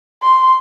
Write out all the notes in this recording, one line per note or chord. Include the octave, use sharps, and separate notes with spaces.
C6